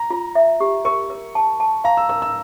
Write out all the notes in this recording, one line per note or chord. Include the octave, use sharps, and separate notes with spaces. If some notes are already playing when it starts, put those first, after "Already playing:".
Already playing: A#5
F4
E5
G4
A#4 C#6
A#4
A5
A5
F5 A#5
E6
A#4 E6
E6